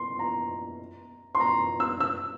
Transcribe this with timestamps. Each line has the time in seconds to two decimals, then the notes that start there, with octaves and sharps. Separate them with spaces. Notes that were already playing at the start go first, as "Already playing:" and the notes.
Already playing: C6
0.19 A#5
1.35 C6
1.40 A#5
1.80 E6
2.00 E6